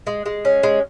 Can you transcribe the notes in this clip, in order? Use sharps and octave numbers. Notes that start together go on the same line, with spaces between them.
G#3
G#3
C#4
G#3